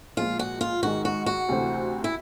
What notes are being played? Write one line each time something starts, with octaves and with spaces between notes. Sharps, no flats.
A#2 F3 G#3 F4
F#4
F4
G#2 D#3 G#3 F#4
F#4
F#4
D2 C3 E3 A3 C4
E4